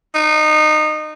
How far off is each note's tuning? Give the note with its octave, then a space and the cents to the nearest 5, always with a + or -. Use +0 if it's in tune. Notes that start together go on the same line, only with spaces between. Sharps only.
D#4 -25